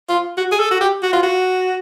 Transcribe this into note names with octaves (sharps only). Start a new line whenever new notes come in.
F4
F#4
G#4
A4
F#4
G4
F#4
F4
F#4